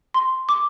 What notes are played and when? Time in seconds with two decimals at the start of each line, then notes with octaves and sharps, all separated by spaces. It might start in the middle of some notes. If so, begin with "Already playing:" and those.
0.14 C6
0.49 D6